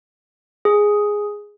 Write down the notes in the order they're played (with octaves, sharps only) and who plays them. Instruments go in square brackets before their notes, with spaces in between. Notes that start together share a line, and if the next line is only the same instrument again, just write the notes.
[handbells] G#4